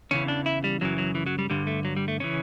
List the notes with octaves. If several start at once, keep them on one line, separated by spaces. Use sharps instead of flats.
E2 C#3 E3 C#4
D4
E4
G3
F#2 C#3 E3 F#3
F#3
E3
F#3
G3
G2 D3 G3
A3
F#3
G3
A3
C#3 E3 C#4